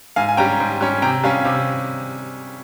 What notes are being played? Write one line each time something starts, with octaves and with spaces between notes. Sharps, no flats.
G#2 F5 G#5
G#5
G3 C#4 G5 A#5
G#2
G3 C#4
C3 G5 A#5
G3 C#4 F5 G#5
C3